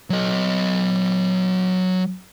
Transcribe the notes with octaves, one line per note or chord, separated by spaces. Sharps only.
F#3 D#5